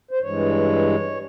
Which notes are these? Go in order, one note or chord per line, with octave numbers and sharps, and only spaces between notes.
C5
G2 E3 G#3 C#5